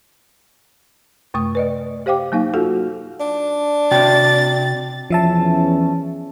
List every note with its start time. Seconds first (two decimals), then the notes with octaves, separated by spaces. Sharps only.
1.34 F#2 C3 A3 D#6
1.55 B4 D5 D#5
2.06 G4 C5 F5 G5 D6
2.32 F#3 A#3 D#4 F5
2.54 F4 F#4 A4 F#5
3.20 D4
3.91 C3 F#4 G5 A6
5.10 E2 F3 C#4 E5 A5